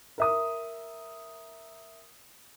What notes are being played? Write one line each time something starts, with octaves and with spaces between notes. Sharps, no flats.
A#4 E5 D#6